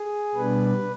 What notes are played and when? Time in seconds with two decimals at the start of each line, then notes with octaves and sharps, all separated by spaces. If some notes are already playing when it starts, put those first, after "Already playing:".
Already playing: G#4
0.35 B2 G3 B3 D4 B4